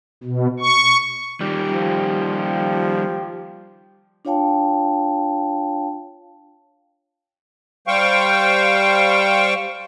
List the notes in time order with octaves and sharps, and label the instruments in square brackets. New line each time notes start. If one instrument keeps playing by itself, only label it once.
[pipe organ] B2
C#6
[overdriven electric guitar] D#3 G3 [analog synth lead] G4
[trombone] F3
[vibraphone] D4 F4 C#5 F5 G5 A5
[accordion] G3 C5 F5 G5 C#6